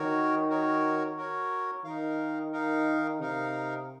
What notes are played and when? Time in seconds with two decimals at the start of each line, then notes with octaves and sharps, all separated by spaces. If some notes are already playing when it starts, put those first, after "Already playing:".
Already playing: D#3 F#4 A#4 C#5
0.49 F#4 A#4 C#5
1.17 F#4 A#4 C#5
1.84 D#3 D#4 A#4 F5
2.53 D#4 A#4 F5
3.20 C3 D#4 A#4 F5